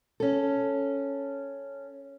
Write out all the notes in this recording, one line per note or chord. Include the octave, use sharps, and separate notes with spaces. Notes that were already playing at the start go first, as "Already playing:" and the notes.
C#4 A4